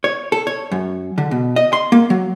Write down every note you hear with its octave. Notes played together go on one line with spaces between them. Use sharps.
C#5
A4
C#5
F#2
D3
B2
D#5
C6
A#3
F#3